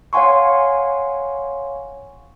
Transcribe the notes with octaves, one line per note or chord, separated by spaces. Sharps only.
C#5 F5 F#5 G#5 C6 C#6